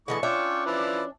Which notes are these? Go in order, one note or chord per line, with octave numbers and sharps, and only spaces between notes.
D3 E3 A3 E4 G#4 D#5 A5 C#6
C#4 D4 F4 E5 G5 D6
F3 E4 B4 D5